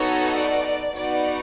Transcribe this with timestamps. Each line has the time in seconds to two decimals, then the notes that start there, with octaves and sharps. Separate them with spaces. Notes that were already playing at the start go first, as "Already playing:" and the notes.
Already playing: B3 D#4 F#4 A4 C#5
0.35 D5
0.95 B3 D#4 F#4 D5